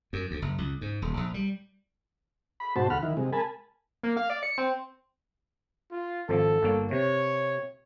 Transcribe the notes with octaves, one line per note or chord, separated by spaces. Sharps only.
F#2
D2
F#1
C#2
G#2
D#1
A#1
G3
B5
G#2 B2 F#4 C5 A5
D2 F#5 B5 F6
D#3 E4
C3 G#3
A#4 G#5 A5 B5
A#3
F5
D5
C#7
C4
F4
G#1 F3 A4
G1 A#3 C#5
C3 C#5